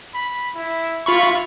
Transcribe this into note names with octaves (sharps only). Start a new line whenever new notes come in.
B5
E4
E4 F4 B5 C#6